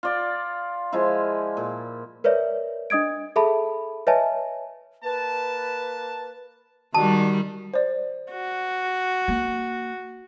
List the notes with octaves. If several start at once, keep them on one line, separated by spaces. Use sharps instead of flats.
F4 D5
F3 G#3 E4
A#2
A#4 B4 C#5 D5 E5
D4 D#5 D#6 G#6 D7
G#4 A4 E5 A5 B5
B4 C#5 D#5 E5 G#5 A5
A#3 B4 A5
D#3 G3 G#3 F#4 D5 A5
C5 D5
F#4
A#3